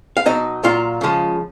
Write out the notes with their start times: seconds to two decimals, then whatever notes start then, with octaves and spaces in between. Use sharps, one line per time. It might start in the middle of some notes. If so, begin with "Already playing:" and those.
0.17 F5
0.25 B2 F#3 D#4 D#5
0.64 A#2 F#3 F4 F5
1.01 C#3 F3 G#3